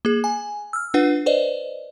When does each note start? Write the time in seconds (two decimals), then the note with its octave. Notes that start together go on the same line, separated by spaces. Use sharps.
0.05 A#3 G#4
0.24 G#5
0.73 E6 F6
0.94 D4 F4 B4 F#5
1.26 B4 C5 D5 D#5